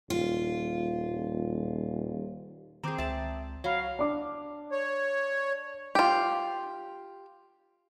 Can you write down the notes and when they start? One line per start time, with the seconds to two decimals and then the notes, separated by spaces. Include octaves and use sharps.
0.10 D#1 F4
2.84 D#3 C4 G#4 A#5 D6 G6
2.98 C#2 D5 E5 A5
3.64 F#3 C#5 F5 B5
3.99 D4 D6
4.72 C#5
5.95 F4 G4